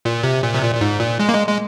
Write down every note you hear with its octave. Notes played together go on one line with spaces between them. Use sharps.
A#2
C3
A#2
C3
A#2
A#2
G#2
A#2
G#3
A#3
G#3
G#3